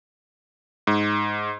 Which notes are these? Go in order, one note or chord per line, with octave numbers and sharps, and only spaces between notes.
G#2